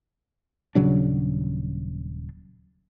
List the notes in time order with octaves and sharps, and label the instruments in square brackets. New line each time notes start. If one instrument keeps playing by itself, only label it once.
[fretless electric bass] D#1 C#3 F#3 D4